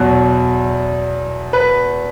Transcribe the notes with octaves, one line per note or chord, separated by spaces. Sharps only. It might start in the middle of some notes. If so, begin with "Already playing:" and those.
Already playing: E2 B2 F#3
B4